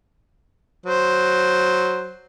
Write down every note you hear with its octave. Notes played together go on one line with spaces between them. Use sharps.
F#3 C5